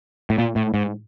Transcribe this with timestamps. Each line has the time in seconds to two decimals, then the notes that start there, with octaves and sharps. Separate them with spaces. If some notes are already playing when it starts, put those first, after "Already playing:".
0.30 A2
0.38 A#2
0.56 A2
0.74 G#2